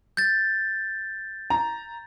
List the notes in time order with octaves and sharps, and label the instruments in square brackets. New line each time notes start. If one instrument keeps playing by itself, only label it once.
[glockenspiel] G6 A6
[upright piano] A#5